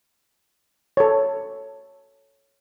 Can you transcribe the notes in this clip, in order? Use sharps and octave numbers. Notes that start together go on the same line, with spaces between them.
A4 C#5